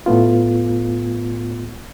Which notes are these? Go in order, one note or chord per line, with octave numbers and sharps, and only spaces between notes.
A2 A3 B3 F4